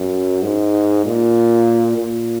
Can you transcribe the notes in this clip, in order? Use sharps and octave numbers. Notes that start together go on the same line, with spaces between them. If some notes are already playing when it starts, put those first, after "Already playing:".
Already playing: F#2
G#2
A#2
A#2